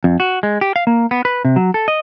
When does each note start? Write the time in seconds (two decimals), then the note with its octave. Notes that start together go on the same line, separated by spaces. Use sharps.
0.04 F2
0.20 F#4
0.43 G#3
0.61 G4
0.76 F5
0.87 A#3
1.11 B3
1.25 B4
1.45 C3
1.56 F#3
1.74 A4
1.88 D#5